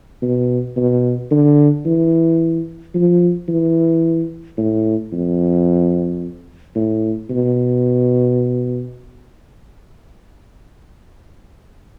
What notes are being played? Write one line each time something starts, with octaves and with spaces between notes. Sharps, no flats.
B2
B2
D3
E3
F3
E3
A2
F2
A2
B2